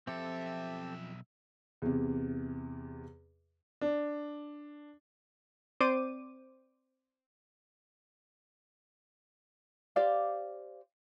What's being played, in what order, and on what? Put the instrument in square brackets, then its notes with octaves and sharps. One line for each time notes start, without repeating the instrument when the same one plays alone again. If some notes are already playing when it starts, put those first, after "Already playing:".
[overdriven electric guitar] B1 E5 [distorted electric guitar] F2 [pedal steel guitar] C4 G4 A4
[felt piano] E2 C3
[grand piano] D4
[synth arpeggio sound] C4 C5 D5 D6 D#7
[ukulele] G4 C5 D5 F5